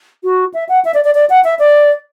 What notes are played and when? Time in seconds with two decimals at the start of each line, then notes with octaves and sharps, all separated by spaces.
0.24 F#4
0.54 E5
0.69 F#5
0.85 E5
0.94 D5
1.04 D5
1.15 D5
1.30 F#5
1.44 E5
1.59 D5